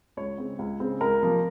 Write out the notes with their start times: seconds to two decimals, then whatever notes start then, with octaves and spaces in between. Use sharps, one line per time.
0.17 C#2 C#5
0.38 C#3 G#3 C4
0.59 C#2
0.80 C#3 G#3 C4
1.01 C#2 A#4
1.22 C3 F3 A#3